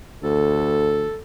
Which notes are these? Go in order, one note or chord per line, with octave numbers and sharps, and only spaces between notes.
D2 A4